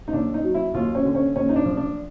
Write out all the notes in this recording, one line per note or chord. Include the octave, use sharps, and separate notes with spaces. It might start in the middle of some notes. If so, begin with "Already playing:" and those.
D#4
D#2 D4
D#4
F#3
E4
D#2 F4
C#4
D3
C#4
D#2 C#4
D#4
D4
F3
D4